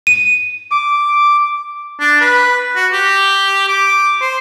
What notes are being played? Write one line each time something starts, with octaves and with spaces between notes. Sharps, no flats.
D#7
D6
D4
B4
F#4
G4
D6
C5